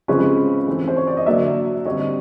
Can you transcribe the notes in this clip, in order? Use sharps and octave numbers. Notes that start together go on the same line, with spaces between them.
C#3 F3 G#3 C4 B4 C#5
E3 A3 C4
C5
C#5
D5
D#5
D3 F#3 A#3 D5 E5
D3 G3 C4 C#5 D#5